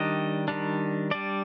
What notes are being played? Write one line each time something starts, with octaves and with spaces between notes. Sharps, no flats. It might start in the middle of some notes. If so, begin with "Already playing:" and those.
Already playing: D#3 G3 D4 D#5
D#3 G3 D4
G3 D4 D5